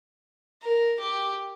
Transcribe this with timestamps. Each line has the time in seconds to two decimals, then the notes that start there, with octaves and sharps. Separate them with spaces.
0.62 A#4
1.00 G4